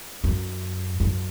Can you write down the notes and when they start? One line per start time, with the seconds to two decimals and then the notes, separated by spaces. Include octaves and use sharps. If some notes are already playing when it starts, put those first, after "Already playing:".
0.24 F#2
1.00 F#2